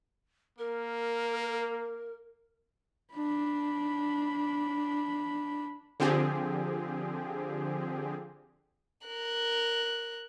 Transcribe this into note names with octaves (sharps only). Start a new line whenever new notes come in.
A#3 A#4
D4 B5
D3 F3 C4 G4 G#4
A#4 F#6